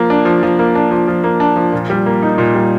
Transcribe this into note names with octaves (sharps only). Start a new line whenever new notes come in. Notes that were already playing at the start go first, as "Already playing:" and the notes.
Already playing: F3 A#3
D4
F3
F3
A#3
D4
F3
F3
A#3
D4
F3
A#2
G3
A#3
D#4
A#2
G3